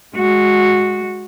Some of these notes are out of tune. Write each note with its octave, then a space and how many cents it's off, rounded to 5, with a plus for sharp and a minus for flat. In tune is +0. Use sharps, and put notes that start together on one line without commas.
G#3 +0 F#4 -10